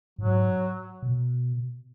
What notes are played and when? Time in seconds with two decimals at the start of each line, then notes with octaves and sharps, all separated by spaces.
0.18 G#2 F#3
1.02 B2